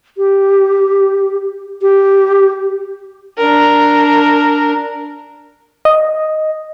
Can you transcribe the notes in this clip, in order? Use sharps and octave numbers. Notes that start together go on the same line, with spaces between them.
G4
G4
D4 A#4
D#5